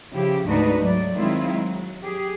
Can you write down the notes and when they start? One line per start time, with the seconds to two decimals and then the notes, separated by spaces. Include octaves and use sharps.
0.12 C#3 F3 E4 G4
0.46 D2 G#2 D4 D#4 F#4 B4
0.80 G#2 F#3 A3 D5
1.13 D#3 F#3 G#3 C4 E4 F4
1.50 F#3
2.02 G4 G#4